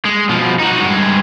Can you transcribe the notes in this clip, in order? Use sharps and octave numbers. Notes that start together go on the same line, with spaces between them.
G#3
B2 F3
D#4 F#4
G2 G#3